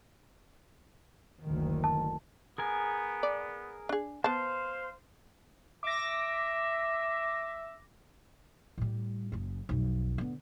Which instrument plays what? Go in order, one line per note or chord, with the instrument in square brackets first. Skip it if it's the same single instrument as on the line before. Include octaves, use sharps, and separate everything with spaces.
[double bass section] F#1 D2 D#3
[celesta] A5
[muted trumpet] B3 [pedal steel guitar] G#4 A#4 G#5
[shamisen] D5
D4 G#4
[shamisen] B3 A5 [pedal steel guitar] C5 [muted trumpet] F5
[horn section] E5 [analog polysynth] D6 A#6
[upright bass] A2 G3
F#1 C#3
B1 F2
D3 B3